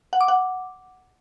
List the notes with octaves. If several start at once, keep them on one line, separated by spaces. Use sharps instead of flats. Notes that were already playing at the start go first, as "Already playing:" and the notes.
F#5
D6
F#5